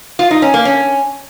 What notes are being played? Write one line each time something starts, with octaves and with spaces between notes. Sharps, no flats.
F4
D#4
C#4
A#3
C#4